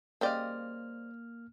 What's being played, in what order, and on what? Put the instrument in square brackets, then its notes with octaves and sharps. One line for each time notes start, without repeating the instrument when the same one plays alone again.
[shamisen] C#3 G3 G5 [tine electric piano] A#3 F6 [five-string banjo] C5 D5 D#5